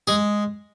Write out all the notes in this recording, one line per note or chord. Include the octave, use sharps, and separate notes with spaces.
G#3 G#4